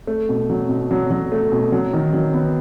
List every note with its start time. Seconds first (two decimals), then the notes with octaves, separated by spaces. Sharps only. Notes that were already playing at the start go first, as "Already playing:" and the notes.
0.07 A3
0.29 B2
0.50 F#3
0.69 B2
0.91 F#3
1.11 F#3
1.32 A3
1.52 B2
1.72 F#3
1.93 D#3
2.13 F#3
2.34 B3